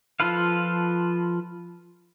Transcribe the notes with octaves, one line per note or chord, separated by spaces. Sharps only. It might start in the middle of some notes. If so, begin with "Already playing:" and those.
F3 F4 A4 B4 F5